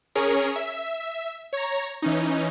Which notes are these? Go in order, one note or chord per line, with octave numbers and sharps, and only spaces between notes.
C#4 G#4 A#4 C#5
E5
C#5 A#5
E3 C#4 D#4